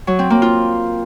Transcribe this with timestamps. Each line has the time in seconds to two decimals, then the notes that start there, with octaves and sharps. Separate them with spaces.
0.07 F#3
0.19 C4
0.30 A#3
0.42 F4